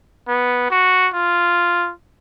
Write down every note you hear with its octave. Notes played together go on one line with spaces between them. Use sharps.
B3
F#4
F4